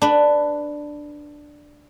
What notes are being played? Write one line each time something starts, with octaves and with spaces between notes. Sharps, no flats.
D4 B4